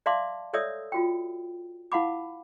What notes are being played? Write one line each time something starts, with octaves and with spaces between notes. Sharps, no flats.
D5 E5 F5 A5 C6 D6
A4 C#5 D5 E5 D#6 E6
F4 F#4 G5
E4 F5 F#5 B5 D6